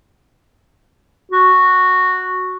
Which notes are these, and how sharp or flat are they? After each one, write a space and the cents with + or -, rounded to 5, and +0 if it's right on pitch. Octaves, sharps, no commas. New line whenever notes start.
F#4 -5